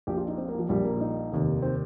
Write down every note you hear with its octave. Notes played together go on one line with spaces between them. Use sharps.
A#1 A#2 G4
F4
D#4
C4
A#3
F3
A#1 A#2 G3
A#3
D#4
F1 D#2 D#3
C4